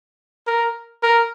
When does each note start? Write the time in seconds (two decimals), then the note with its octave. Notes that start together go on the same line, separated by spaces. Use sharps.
0.47 A#4
1.03 A#4